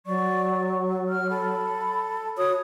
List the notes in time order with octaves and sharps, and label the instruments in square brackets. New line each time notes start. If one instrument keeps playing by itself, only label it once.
[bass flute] F#3 [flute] D5 [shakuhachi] C#6
[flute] F6
[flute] A4 [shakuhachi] B5
[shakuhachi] F#4 [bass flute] C#5 [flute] D#6